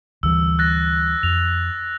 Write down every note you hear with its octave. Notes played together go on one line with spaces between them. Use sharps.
D2 E3 G3 E6
F#6 A6 A#6
F2 F7